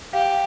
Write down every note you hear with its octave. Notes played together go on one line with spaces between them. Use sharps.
G4 F5